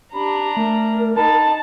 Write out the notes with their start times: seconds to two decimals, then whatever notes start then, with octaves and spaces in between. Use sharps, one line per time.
0.13 D4 G4 A#5 B5
0.57 A3 A#4
1.17 D#4 A5 B5